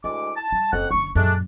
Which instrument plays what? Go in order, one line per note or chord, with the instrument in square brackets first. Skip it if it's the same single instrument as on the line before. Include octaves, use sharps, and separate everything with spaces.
[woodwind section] D2 G#3 D6 [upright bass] E4
[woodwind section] A5
[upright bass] G3
[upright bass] F#1 [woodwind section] F2 F#5
[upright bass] F#1 D3 [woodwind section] C#6
[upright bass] F#2 A#2 [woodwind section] G#3 A3 D4